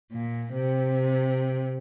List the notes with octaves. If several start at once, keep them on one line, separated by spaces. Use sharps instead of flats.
A#2
C3